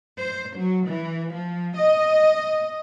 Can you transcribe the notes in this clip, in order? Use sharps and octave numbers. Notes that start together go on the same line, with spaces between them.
C5
F#3
E3
F3
D#5